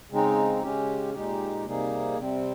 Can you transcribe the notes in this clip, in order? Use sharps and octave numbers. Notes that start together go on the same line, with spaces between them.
C#3 G#3 C4 D#4
C#3 G#3 C#4 G4
A#2 G#3 D#4 G4
C3 G3 A#3 D#4 G#4
C3 G3 C4